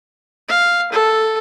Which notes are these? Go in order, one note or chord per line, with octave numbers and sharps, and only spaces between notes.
F5
A4